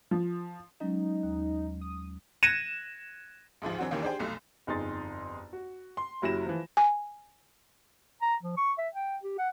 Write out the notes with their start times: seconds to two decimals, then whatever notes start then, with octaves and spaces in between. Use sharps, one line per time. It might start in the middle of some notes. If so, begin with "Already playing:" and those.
0.11 F3
0.80 F#3 G#3 C#4 D#4
1.23 D#2
1.81 D#6
2.43 F#6 G#6 A#6 C#7 D#7 E7
3.62 A1 D2 G#2 F3
3.78 E3 F#3 C4 D4 F#4
3.91 D#2 D#3 E3 A#3 C#4
4.03 D4 G4 G#4 C5 G5
4.19 F1 B1 A3
4.67 G1 F2 D#4 G#4 C6 A6
5.53 F#4
5.97 C6
6.22 F#1 F#3 E4 G4 A#6 E7
6.46 E3 F3
6.77 G#5
8.22 A#5
8.43 F3
8.57 C#6
8.78 E5
8.94 G5
9.23 G4
9.38 F#5